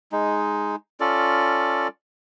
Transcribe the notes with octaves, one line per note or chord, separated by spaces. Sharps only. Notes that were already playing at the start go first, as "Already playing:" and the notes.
G#3 D#4
C#4 F4 A4 D5